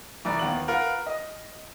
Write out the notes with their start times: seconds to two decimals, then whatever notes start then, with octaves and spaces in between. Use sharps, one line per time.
0.25 C2 E3 A3 D5 A#5
0.39 D#2 B3 F4 F#7
0.68 F4 A#4 B4 F#5 F6
1.06 D#5 D#6